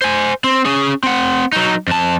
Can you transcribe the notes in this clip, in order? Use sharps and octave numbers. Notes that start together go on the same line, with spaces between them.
C5 G#5
C4
C#4 G#4
C4 F#5
F#3 D#4
F2 A5